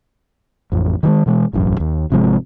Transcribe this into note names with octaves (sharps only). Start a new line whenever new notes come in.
A1 F2
D#3 F3 G#3
B2 E3 G#3
E1 A1 F#2
D#2
G#1 C3 F3 G#3